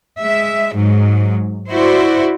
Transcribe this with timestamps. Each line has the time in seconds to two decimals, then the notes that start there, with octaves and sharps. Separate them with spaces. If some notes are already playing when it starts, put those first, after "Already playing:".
0.19 G#3 E5
0.74 G#2 F#3
1.69 E4 F#4 C5 D5